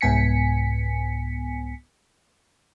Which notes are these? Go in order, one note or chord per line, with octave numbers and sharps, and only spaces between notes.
C2 G#2 B3 G#5 B6 C#7